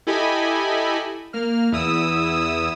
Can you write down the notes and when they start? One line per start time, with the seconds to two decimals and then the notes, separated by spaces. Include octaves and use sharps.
0.07 E4 G4 A4 D#5 G#5 B5
1.33 A#3 F6
1.72 E2 E4 D#6 E6